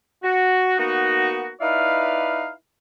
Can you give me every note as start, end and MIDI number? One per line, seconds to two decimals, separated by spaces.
0.23 0.76 66
0.79 1.50 58
0.79 1.50 59
0.79 1.50 63
0.79 1.50 66
1.61 2.50 63
1.61 2.50 64
1.61 2.50 71
1.61 2.50 74
1.61 2.50 77